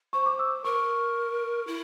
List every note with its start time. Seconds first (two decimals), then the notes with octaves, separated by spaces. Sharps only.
0.13 C5 C#6
0.26 D6
0.39 E6
0.64 A#4 C#6
1.67 E4